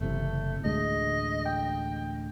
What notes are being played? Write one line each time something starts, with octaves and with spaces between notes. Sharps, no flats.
F#1 C3 E3 A3
A1 D2 G#3 D#5
G5